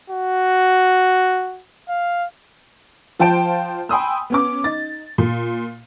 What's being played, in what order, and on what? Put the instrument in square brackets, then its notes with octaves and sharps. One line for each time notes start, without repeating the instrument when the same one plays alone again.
[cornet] F#4
F5
[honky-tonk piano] F3 F4 C5 G5 A5 D7
G5 G#5 B5 C6 D#6 E6
B3 C#4 D6
D#4 A6
A#2